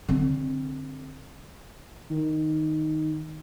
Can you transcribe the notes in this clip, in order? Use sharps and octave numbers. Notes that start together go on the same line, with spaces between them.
D3 C4
D#3